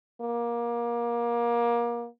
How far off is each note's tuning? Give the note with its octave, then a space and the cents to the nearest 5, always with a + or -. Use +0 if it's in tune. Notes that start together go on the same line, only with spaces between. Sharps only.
A#3 +25